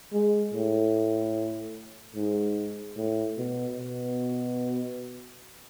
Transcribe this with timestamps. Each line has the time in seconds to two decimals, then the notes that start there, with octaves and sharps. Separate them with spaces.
0.13 G#3
0.54 A2
2.16 G#2
2.97 A2
3.38 B2
3.78 B2